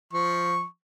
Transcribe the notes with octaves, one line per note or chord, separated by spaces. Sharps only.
F3 C#6